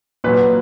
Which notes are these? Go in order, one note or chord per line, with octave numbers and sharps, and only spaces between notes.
A#2 F#3 B4